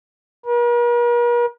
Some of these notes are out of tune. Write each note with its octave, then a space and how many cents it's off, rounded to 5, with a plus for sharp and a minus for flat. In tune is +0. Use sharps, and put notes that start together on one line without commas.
A#4 +45